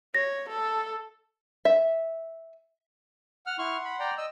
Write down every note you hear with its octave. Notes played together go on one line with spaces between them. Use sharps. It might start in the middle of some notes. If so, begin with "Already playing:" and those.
C#5 A#6
A4
E5
F#5 F6
E4 F#5 C6 C#6 F6
B5
D5 G5 A#5
D#5 E6